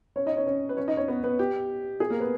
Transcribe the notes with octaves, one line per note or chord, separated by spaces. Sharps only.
C#4 C#5
D#4 D#5
C#4 C#5
C#4 C#5
B4
C#4 C#5
D#4 D#5
C#4 C#5
B3 B4
B3 B4
G4
G#4
A#3 A#4
B3 B4